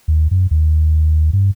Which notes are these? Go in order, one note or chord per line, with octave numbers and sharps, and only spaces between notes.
D#2
F#2
D#2
G2